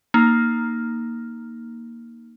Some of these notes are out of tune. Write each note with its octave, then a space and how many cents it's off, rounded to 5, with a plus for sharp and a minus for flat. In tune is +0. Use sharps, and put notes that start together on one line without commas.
A#3 +0 D#4 +0